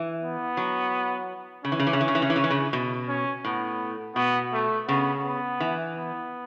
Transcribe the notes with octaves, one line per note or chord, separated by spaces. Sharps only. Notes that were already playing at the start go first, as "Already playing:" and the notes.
Already playing: E3
B3
F#3
C#3 C#4
E3
C#3
E3
C#3
E3
C#3
E3
C#3
E3
C#3
E3
C#3
B2
C#4
A2 B3
B2 B3
A3
C#3 B3
B3
E3
B3